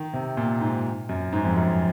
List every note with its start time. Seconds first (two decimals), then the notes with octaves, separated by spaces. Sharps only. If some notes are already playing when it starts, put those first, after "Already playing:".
Already playing: D#3
0.13 C3
0.37 A#2
0.61 G#2
1.09 F#2
1.32 G#2
1.45 F2
1.56 F#2